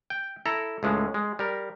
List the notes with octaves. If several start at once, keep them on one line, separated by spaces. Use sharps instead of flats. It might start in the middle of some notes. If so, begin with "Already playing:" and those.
G5
E4 A4 A#5
C#2 A2 G#3
G#3
G3 A#4